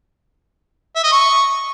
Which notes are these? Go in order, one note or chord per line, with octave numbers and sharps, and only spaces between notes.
E5
D#5
C#6